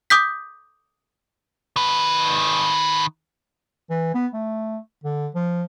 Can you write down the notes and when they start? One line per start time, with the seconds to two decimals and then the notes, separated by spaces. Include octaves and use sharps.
0.10 D6 D#6 G6 B6
1.76 D#3 B4
3.90 E3
4.14 B3
4.34 A3
5.04 D3
5.35 F3